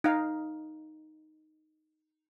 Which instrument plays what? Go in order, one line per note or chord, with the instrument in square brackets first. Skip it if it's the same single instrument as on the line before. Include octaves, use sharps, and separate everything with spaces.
[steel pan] D#4 F5